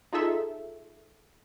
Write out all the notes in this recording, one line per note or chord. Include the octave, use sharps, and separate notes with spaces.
D#4 F4 G#4 A4 E5